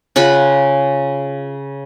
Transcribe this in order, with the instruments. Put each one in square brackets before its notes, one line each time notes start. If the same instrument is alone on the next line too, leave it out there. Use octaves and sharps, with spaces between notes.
[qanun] C#3 F4 F#5 B5